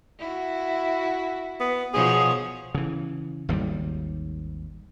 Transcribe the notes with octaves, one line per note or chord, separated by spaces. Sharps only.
E4 F#4
B3
B2 F3 G#4 C#5
C#3 E3
G#1 D#2 D#3 G3